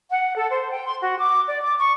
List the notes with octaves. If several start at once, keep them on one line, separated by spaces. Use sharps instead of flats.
F#5
A4
C5
G5
C6
F#4
D6
D5
D6
C#6